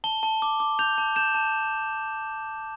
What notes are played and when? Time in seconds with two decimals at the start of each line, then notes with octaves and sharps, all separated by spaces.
0.04 A5 G7
0.23 A5
0.42 D6
0.60 D6
0.79 G6 F7
0.98 A5
1.16 G6 E7
1.35 A5